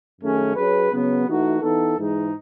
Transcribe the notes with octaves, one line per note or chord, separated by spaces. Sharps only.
F#2 D#3 A3 C#4 G#4
F#3 C#4 G#4 B4
C#3 F#3 B3
E3 A3 D#4 F#4
E3 B3 D#4 A4
G#2 E3 G#3 D#4